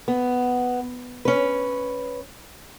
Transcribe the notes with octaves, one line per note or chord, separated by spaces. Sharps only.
B3
C#4 B4